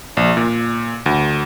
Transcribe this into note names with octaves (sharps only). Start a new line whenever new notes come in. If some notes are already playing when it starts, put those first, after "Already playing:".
A#1
A#2
D2